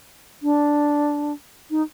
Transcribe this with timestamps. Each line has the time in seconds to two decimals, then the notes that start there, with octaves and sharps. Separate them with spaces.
0.43 D4
1.71 D#4